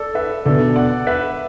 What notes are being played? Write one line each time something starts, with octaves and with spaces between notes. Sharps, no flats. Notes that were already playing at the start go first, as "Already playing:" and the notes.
Already playing: A4 D5
B4 E5
B2 B3 D4 A4 D5
D5 F#5
B4 E5